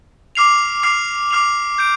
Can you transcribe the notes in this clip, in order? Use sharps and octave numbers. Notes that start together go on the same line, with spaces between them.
D6 F6 C7 F7
D6 F6 C7 F7
D6 F6 C7 F7
G6 D7